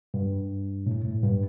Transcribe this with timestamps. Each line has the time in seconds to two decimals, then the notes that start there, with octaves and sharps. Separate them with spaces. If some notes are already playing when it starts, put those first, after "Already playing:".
0.14 G2
0.86 A2
1.04 A2
1.23 G2